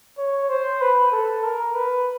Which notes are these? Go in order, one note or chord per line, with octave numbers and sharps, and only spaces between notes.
C#5
C5
B4
A4
A#4
B4